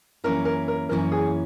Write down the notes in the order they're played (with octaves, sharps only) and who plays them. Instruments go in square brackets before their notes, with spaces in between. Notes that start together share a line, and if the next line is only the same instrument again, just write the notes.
[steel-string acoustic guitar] F#2 E3 A#3 C#4 E4 [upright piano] A#4
[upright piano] A#4
A#4
[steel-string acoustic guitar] F#2 E3 A#3 C#4 E4 [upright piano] A#4
[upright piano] G#4